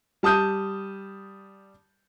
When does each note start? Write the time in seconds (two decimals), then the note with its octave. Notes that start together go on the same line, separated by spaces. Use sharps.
0.23 G3 A5 D#6 G6 D#7